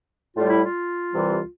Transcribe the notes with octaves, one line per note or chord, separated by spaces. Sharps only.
A2 G3 F4
E4
F4
C2 C3 E3 G3